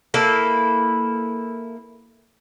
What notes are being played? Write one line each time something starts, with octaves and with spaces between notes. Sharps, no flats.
A#3 E4 A4 B4